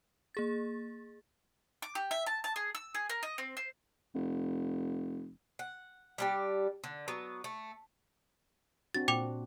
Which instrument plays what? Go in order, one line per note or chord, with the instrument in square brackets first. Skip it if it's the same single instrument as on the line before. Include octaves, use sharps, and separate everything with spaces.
[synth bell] A#3 G#4 A6
[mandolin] D6
G4
E5
A5
A5
G#4
E6
G#4
A#4
D#5
C4
C5
[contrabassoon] F1
[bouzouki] F#5
G3 D4 G4
D3
F#3 B3
A3
[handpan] C4 D4 F#4 [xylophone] A6
[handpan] A#2 [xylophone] G5 D6 F7